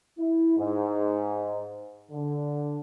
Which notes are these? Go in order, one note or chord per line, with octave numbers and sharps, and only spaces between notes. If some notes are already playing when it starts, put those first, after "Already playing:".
E4
G#2
D3